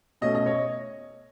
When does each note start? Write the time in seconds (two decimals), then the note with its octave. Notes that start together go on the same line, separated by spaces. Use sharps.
0.21 B2 A3 C#4 D#5
0.35 D#5
0.46 C#5